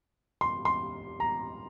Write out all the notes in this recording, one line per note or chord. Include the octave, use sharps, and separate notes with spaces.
C6
C6
A#5